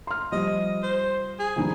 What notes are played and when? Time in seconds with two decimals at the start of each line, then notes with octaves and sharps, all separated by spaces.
0.07 C6 F6
0.32 F3 G3 D#5
0.83 C5
1.39 G#4
1.56 G2 D#3 F3